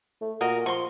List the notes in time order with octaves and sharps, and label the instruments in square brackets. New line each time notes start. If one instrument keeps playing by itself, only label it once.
[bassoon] A3
[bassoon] A#2 [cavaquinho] F#4 A#4 D#5
[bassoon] F3 [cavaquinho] C6 C#6